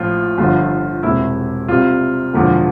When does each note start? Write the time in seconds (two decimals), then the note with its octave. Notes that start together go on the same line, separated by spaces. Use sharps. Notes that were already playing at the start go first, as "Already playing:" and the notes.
Already playing: A1 A2 F3 F4
0.38 G1 G2 D3 F3 F4
1.03 E1 E2 C3 E4
1.68 C2 C3 G3 F4
2.34 E1 E2 D3 F3